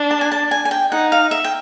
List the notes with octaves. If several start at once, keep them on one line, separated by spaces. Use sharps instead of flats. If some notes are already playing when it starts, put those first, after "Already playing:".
Already playing: D4
A5
G#5
A5
G#5
G#5
G5
D#4 F#5
F5
E5
G5